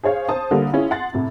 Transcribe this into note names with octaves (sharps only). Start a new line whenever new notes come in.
G#4 C5 C#5 F5
C5 A5 D#6
D3 G3 A#3
C#4 E4 F4 G#4
F#5 C6 A6
A2 C3